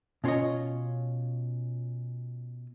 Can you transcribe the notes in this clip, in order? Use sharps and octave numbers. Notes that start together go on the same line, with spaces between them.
B2 C#4 F4 A#4 C#5 D#5